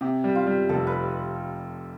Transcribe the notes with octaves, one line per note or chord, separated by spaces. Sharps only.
C3 G4
G3
F4
G3
F1 A4
B4